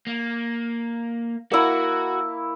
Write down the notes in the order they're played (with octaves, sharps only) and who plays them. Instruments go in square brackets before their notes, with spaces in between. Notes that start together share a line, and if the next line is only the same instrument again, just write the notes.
[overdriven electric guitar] A#3
[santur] A#3 E4 [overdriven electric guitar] F#4 F#5